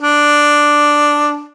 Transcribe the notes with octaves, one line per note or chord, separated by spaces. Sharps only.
D4